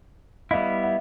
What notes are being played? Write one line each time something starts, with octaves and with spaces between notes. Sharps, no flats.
G3 B3 E4 D#5 F5
E5 F#5